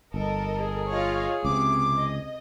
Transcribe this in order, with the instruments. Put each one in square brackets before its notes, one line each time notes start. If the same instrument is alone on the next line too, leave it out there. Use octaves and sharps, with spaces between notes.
[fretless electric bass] G1 [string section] A4 A#4 D#5
[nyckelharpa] G#4
[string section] F4 C#5 F5 [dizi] D#5
[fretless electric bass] C#2 [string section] C3 [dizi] D6
[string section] D#5